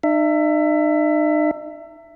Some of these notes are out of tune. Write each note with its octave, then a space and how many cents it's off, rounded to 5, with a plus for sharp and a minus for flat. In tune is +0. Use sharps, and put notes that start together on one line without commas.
D#4 -40 E5 +20